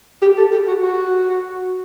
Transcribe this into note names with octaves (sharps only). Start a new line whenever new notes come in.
G4
A4
G4
F#4
F#4